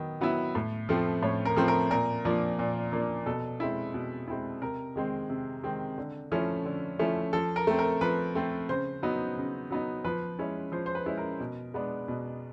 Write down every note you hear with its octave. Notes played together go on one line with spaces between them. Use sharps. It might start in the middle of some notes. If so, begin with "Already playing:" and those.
Already playing: D#3 F#3 B3
F#3 B3 E4
A2
F3 A3 C4
A2 C#5
A#4
F3 A3 C4
A#4
A#2 A#4
F3 A#3 D4
A#2
F3 A#3 D4
B2 A4
G#3 C4 E4
B2
G#3 C4 E4
C3 A#4
D#3 G#3 C4
C3
D#3 G#3 C4
D3
F3 A3 C#4 E4
D3
F3 A3 C#4 E4
F3 A4
A#4
A3 C4
A#4
F3 B4
A3 C4
C#3 C5
F#3 B3 D#4
C#3
F#3 B3 D#4
F3 B4
G#3 C#4 E4
F3 C5
C5
B4
G#3 C#4 E4
A#4
B2
G#3 B3 D4
B2